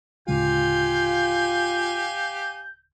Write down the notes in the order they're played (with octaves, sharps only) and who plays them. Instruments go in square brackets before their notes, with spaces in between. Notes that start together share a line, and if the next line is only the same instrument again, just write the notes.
[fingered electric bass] D1 C#3 G#3 [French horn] F4 [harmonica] G4 F5 G#5 [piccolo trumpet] G6